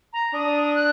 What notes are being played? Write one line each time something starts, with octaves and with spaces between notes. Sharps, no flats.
A#5
D4 D#6
F#6